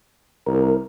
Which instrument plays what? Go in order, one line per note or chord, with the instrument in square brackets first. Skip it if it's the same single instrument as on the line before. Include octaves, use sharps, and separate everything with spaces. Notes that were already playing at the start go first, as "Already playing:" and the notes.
[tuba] C2 [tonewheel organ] A#4